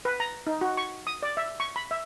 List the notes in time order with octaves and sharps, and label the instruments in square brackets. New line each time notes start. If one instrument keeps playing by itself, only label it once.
[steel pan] B4
A#5
D#4
F#4
C#6
D#6
D5
E5
C#6
B5
E5